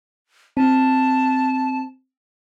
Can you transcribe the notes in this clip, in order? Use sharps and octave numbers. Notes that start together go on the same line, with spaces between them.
C4 A5